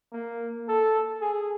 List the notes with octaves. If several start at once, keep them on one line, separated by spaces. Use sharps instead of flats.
A#3
A4
G#4